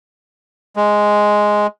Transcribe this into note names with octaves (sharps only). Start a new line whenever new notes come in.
G#3